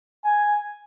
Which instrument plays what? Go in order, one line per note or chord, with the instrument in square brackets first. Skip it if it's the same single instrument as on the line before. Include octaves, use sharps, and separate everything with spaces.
[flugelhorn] G#5